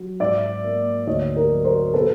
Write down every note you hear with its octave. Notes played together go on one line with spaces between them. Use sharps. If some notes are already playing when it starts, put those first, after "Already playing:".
Already playing: F#3
G#2 D5 E5
A#3
D2 C#5 D#5
A#4
F#3
A#4 C5
B2 A4 B4